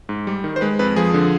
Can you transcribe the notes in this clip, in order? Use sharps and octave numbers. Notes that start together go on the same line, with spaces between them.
G#2
G3
D#3
C5
G#3 B4
F2 B4
F3 G#4
D3